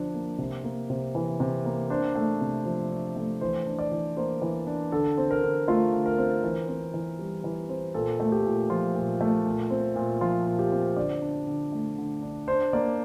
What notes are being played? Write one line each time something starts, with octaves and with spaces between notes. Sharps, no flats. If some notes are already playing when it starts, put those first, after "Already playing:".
Already playing: D3 F3 D4 C5
A#3
C3
A#3
C3
E3
C3
A#3
D4 C5
A3
C3
F3
D4
A3
E3 C5
D4
D5
E3
A#3 C5
E3
D4
D3 A4
C4
A#4
D3
A3 F4
D3
A#4
C4
E3
C4
E3
G3
E3
C4
A#2 A4
A3
G4
A#2
F3 F4
A#2
A3
A#2
C4
A#2
F3 F4
A#2
G4
C4
D3 D5
D4
D3
A3
D3
D4
D4 C5
A#3 D5